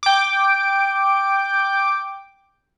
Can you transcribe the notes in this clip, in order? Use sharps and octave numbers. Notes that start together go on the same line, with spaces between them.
G5 D6